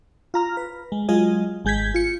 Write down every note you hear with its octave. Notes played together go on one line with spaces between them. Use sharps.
F4 A#5 F6
B4
G#3
F#3 G#3 F4 G#4 D#5
G#1 G#3 G6 G#6 B6
F4 C#7